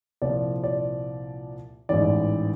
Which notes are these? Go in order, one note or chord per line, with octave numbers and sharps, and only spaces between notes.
C2 A#2 F3 D5
D5
A1 G#2 E3 D5